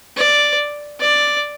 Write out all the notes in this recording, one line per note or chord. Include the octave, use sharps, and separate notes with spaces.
D5
D5